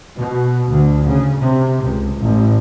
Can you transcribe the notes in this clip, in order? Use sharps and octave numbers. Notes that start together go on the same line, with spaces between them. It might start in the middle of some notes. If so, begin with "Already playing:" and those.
B2
D2
C#3
C3
C#2
A1